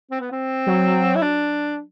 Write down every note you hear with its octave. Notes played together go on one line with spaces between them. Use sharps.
C4
B3
C4
F#3
E4
D4